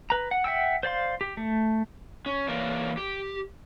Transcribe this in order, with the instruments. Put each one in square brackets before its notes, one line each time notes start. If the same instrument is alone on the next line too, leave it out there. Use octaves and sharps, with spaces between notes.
[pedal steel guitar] B4 A#5
F#5
E5 F#5 G5 E6
C5 D5 F5 C6
G4
A3
[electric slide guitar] C#4
E3 A#3 A#4 C#5 D5
G4